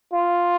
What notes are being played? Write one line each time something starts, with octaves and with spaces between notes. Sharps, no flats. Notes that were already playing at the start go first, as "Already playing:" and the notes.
F4